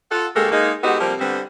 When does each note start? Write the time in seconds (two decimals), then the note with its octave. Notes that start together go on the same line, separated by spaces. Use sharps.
0.11 F4 A4 F#5
0.36 D2 G#3 A#3 G4 A4
0.52 G#3 A#3 D#4
0.83 G#3 B3 D#4 F#4 G4 A4
1.00 C3 F3 G3 A#3 C4 G4
1.19 D3 G3 B3 C4